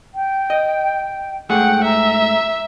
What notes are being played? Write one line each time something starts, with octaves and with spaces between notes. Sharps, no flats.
G5
D#5
G#2 A3 G#4 F#5 G5
E5 A#5